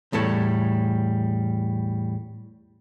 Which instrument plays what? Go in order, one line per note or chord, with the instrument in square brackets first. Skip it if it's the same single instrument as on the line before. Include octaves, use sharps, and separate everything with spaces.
[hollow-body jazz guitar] E2 A2 G3 A4 C#5